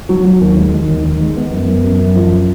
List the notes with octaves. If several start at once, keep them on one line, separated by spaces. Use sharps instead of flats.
F#3
F#3
D#2
G#3
D#3
D#2
D#3
G#3
B3
F#2
F#2
F#2
F#2
F3